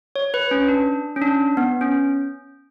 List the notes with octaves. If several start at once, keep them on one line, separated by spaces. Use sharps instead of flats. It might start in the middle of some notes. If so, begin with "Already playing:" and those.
C#5
B4
C#4
D4
C#4
D4
B3
C#4